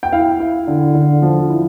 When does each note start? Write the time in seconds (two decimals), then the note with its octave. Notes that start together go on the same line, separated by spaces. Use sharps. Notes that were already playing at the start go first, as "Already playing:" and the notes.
0.03 G5
0.13 E4 F5
0.40 E4
0.67 D3
0.95 D3
1.22 F3
1.50 E4